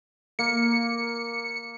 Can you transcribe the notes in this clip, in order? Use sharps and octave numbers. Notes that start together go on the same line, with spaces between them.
A#3 C#7